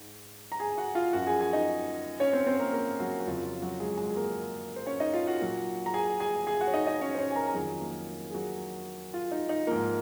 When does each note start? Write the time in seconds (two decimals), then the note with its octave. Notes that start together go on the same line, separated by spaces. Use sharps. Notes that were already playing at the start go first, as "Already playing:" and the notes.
Already playing: G#2
0.52 A#5
0.60 G#4 G#5
0.77 F#4 F#5
0.95 F4 F5
1.13 F#2 F3 F#4 F#5
1.27 G#4 G#5
1.40 G#4 G#5
1.53 D#4 D#5
2.20 C#4 C#5
2.33 C4 C5
2.47 C4 C5
2.59 A#3 A#4
2.73 A#3 A#4
3.00 F#3 F#4
3.20 F#4
3.27 F2 C#3 F#3 F4
3.44 F4
3.62 F#3 F#4
3.80 G#3 G#4
3.97 G#3 G#4
4.10 G#4
4.16 A#3 A#4
4.76 C5
4.86 C#4 C#5
5.00 D#4 D#5
5.14 F4 F5
5.27 F#4 F#5
5.41 A#2 F#3
5.86 A#5
5.94 G#4 G#5
6.20 G#4 G#5
6.47 G#4 G#5
6.61 F#4 F#5
6.67 C#5
6.74 D#4 D#5
6.87 D#4 D#5
7.01 C#4 C#5
7.14 C5
7.18 C#4 C#5
7.30 G#5
7.36 A#4 A#5
7.47 A#5
7.54 F2 D#3 F#3 G#4 G#5
7.80 A#3 A#4
8.30 G#4
8.34 F#3 F#4
9.14 F4
9.32 D#4
9.49 D#4
9.67 G#2 F3 A#3 A#4